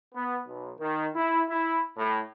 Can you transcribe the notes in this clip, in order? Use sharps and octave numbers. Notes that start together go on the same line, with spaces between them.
B3
B1
D#3
E4
E4
A2